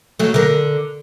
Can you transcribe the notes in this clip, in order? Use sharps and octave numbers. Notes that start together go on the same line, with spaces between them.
F#3 A3
D3 A#4